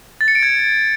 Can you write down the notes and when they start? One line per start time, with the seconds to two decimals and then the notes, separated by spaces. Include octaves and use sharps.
0.21 A6
0.28 C#7
0.35 D7
0.43 G#6